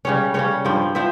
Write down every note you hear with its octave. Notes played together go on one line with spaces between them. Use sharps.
C#3 G3 C#4 C#5
C#3 G3 C#4 C#5
G2 F3 C4
F3 C4 E5